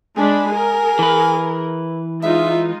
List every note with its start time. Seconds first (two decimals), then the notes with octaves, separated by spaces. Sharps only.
0.17 G#3 D4 G#5 B5
0.53 G#4 A#4
0.99 E3 B4
2.23 G#3 D#4 F4 E5